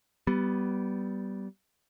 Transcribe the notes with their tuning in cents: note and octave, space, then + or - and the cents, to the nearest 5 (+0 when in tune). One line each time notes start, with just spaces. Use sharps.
G3 -15 B3 +0